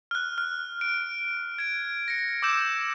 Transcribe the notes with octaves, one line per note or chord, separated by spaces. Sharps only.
F6 F#6
F6
D7
G#6 D7
A#6 C#7
D6 E6 G6 E7